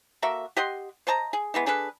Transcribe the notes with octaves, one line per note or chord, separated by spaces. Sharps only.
A#3 F#4 A4 E5
G4 D#5 F#5 C6
C5 D#5 A5 A#5
G#4
E3 G#3 B3
D4 G#4 A4 B4